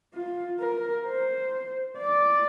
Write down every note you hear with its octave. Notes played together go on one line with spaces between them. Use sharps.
F4
A#4
C5
D5